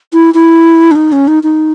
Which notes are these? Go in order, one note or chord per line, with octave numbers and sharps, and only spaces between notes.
E4
E4
D4
D#4
C#4
D#4
D#4